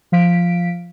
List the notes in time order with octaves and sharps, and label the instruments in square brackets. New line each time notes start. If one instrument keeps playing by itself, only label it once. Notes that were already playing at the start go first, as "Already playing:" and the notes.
[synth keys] F3 F5 B6 D7